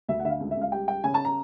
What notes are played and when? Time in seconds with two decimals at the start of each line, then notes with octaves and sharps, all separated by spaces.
0.08 D2 E5
0.20 F#5
0.25 D3 E5
0.30 F5
0.41 C#2
0.51 E5
0.57 C#2 F5
0.72 G3 G5
0.88 G3 G5
1.04 C#3 G#5
1.14 A5
1.25 A#5